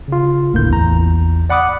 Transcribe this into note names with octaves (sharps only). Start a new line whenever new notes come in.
C#3 F4
G1 D2 A2 A#3 E4 G6
A1 E2 A#5
D5 F#5 B5 D6 D#6 F#6